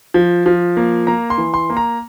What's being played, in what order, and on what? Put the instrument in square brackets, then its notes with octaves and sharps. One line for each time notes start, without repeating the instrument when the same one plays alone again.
[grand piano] F3
F3
A#3
A#3 A#5
C6
E3
C6
A#3
A#5